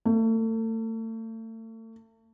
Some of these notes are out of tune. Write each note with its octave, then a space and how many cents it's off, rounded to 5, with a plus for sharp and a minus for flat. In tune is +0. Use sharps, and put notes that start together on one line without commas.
A3 +35